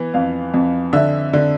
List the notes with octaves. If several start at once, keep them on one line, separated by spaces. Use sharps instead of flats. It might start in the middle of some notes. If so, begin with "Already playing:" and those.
Already playing: E3 B3
F2 F5
F2
D3 E5
D3